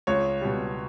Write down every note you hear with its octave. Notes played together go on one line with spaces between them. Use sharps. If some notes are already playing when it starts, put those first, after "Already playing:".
C#2 C#5
B2 G3